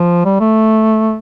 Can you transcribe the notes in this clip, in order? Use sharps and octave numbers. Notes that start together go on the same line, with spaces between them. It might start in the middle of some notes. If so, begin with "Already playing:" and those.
Already playing: F3
G3
A3